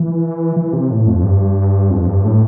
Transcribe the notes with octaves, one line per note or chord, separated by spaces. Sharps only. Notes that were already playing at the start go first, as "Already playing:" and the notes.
Already playing: E3
E3
C3
A2
F2
G2
F2
G2
A2